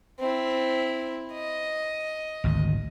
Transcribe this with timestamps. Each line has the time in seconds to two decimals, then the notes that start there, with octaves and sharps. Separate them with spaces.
0.20 C4 E4
1.33 D#5
2.44 G#1 D2